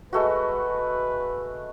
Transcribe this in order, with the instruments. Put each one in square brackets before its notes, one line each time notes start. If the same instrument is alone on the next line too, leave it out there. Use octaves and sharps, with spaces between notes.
[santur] G#3 A3 F#4 [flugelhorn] B4